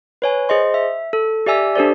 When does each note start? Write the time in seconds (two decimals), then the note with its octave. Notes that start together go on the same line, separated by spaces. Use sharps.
0.22 B4 C#5 G#5
0.49 G#4 C5 D#5 C6
0.74 E5
1.13 A4
1.46 G4 D5 E5 G#5 E6
1.76 D4 G4 A4 C5 D5